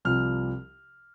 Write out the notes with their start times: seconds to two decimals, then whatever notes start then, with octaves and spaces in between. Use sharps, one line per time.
0.05 C2 C3 F3 F6